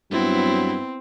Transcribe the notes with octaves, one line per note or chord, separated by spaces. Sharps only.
G2 F#3 B3 C4 E4